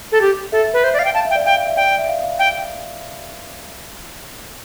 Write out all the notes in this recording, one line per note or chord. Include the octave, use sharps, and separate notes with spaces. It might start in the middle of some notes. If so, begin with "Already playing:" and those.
A4
G4
A4 E5
E5
B4
C5 E5
D5
F5
G5
F5 A5
E5
G5
D5
F5 G5
F5
E5
D5 G5
D5
E5
F5
F5
G5